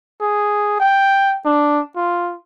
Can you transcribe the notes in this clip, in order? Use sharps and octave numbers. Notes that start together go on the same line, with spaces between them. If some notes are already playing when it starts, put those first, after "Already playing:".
G#4
G5
D4
F4